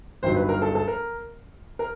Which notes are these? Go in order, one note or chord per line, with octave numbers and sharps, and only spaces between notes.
G1 G2 D#3 F#3 C5
B4
A#4
A4
A4
A#4
A#4